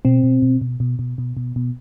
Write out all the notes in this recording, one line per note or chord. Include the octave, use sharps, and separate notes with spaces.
B2 C4
B2
B2
B2
B2
B2
B2
B2
B2